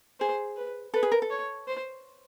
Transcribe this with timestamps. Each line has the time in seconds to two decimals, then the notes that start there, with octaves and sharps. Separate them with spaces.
0.20 G#4 C5
0.56 B4
0.94 A4 B4
1.03 G#4
1.12 A#4
1.22 A4
1.30 C#5
1.68 C5